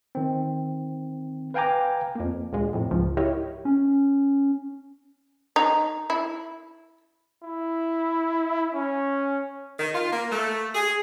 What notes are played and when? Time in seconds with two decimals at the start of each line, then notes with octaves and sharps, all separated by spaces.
0.15 D#3 C4
1.54 B4 F5 G5 G#5 A#5 D6
2.15 F2 A#3
2.52 D2 A#2 G#3
2.73 F2 A2 C3
2.91 C#2 G#2 F3
3.17 E4 G4 A#4 C#5 D#5
3.65 C#4
5.56 D#4
6.10 E4
7.43 E4
8.74 C#4
9.79 D#3
9.94 F4
10.13 A#3
10.31 A3
10.75 G#4